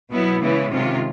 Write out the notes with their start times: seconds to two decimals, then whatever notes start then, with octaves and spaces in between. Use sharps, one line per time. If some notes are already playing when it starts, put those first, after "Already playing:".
0.11 B2 F#3 B3 E4
0.42 C#3 E3 G#3 B3 E4
0.71 C3 D#3 G#3 C#4 F4